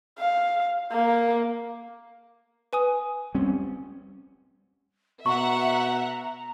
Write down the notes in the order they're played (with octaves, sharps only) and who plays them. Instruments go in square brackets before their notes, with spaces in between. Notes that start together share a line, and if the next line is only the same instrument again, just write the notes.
[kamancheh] F5
A#3
[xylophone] B4 G#5 D#6
[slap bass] G3 C4 C#4
[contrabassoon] B2 [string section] E5 F#5 [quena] A#5 [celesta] C#6